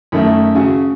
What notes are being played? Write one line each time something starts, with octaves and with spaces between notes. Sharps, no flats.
F#2 D#3 A3 C#4 E5
C#3 F#4